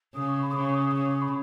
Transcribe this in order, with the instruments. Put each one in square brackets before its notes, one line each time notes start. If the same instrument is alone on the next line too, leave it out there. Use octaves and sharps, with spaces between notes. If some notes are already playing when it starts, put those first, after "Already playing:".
[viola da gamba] C#3 [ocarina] D#6
[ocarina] C#6
B5
D#6
[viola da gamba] C#3 [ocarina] C#6
[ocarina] D#6
[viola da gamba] C#3 [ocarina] D#6
[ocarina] C#6
B5